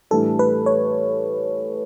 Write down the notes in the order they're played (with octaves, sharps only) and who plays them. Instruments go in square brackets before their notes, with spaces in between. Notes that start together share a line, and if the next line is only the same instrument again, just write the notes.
[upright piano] A2 E3 G3 D4 [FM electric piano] A4
[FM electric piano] B4
C#5